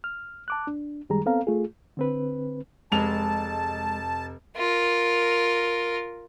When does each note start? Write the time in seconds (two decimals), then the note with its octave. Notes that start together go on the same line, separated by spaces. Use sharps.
0.04 F6
0.48 A5 D6 F#6
0.67 D4
1.09 F#2 D#3 G3 G#3 G#4 A#5
1.26 B3 C4 A4 F5 A#5
1.47 A3 F4 G#4
1.97 D3 C4 B4
2.92 F1 G#3 A5 F7
4.57 F4 A#4